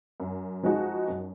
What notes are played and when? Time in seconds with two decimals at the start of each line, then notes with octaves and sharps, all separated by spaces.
0.20 F#2
0.63 F3 G#3 D#4 F#4
1.08 F#2